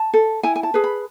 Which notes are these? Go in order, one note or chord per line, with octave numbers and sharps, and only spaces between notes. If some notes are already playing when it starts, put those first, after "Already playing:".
Already playing: A5
A4
E4 G#5
G#5
A5
G#4 B4
B5